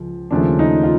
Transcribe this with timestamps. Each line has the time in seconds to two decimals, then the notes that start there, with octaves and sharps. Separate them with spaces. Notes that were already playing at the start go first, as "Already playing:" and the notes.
Already playing: C#2 F3
0.31 D#2 C#3 F3 A3 D4
0.59 D#4
0.83 F4